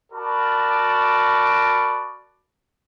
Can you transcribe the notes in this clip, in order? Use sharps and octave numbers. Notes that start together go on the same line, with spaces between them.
F#4 A#4 D5 A5 B5